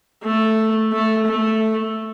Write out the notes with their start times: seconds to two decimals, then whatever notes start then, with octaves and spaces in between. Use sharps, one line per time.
0.23 A3
0.92 A3
1.26 A3